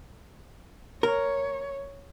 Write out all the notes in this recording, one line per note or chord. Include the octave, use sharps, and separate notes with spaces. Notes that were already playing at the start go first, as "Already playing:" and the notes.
A#4 C#5